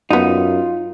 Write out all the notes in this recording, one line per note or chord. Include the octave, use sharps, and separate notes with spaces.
F#2 D3 B3 D#4 F4